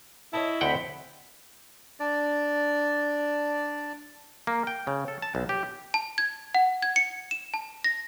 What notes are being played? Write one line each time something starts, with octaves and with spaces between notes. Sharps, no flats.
E4 C#5 D#5 A5
D2 C4 F#5 G5 B5
D4 D5
A#3
G5
C#3
A4
A5
B1
G4
A5
G#6
F#5
G#6
C#7
E7
A5
A#6